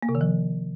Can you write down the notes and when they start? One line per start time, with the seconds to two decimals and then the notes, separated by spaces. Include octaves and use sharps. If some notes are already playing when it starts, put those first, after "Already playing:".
0.03 A#3
0.09 C3
0.15 D#3
0.21 F3